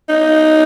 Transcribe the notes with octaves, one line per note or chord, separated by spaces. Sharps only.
D#4